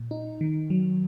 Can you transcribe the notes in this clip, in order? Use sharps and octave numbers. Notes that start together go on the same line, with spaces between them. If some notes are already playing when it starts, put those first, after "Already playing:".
Already playing: A#2
D#4
D#3
F#3